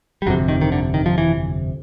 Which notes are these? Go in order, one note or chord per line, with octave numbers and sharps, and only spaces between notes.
G3
G1 F2 C3 F#3
D#3
D#3
D3
D#3
F3
E3